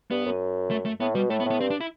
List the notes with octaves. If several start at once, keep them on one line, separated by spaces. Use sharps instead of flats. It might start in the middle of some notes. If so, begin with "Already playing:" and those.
G2 B3
F#2
A3
A3
A2 B3
B2 G3
A2 A3
B3
A2
B3
G2 C4
D4
E4